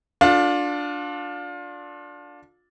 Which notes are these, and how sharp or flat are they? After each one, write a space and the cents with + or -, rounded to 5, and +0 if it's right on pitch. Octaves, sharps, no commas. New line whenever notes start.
D4 -5 F4 +30 A4 +0